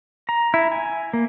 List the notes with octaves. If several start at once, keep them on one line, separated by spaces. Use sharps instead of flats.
A#5
E4
G#5
A#3